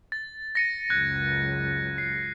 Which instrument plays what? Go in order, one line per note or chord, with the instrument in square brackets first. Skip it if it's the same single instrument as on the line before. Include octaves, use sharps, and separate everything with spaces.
[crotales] A6
A#6 C#7 D#7
[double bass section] C#2 F#2 [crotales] F#6 G#6
[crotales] C7